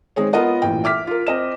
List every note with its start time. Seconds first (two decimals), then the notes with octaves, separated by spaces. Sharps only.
0.16 D#3 G#3 C4 G#4 C#5
0.33 B3 F4 A#4 D#5 F#5
0.62 A1 A#2 E3 G5
0.84 E5 D6 F6 B6
1.07 F4 A#4
1.27 C4 D#5 E7